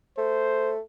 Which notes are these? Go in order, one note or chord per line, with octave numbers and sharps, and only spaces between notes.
A3 C5